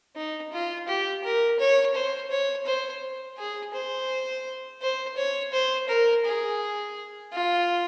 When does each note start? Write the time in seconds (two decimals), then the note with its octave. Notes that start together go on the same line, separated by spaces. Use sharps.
0.16 D#4
0.53 F4
0.88 G4
1.24 A#4
1.60 C#5
1.95 C5
2.30 C#5
2.66 C5
3.38 G#4
3.74 C5
4.81 C5
5.17 C#5
5.53 C5
5.88 A#4
6.25 G#4
7.33 F4